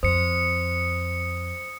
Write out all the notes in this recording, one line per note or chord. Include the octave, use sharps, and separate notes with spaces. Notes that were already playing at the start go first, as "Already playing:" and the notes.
F2 C5 D#6 C#7